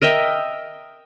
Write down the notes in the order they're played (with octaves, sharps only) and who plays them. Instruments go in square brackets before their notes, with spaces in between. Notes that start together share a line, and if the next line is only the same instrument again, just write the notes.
[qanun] A#4 D#5 E5 G5